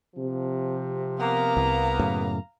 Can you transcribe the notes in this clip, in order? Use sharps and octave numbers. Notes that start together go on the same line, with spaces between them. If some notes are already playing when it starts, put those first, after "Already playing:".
C3 F3
A#3 B3 F5 A#5
C2
F#2 A2 C#3